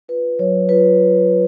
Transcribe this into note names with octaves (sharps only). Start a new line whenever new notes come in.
F4 B4
F#3 C#5
F4 B4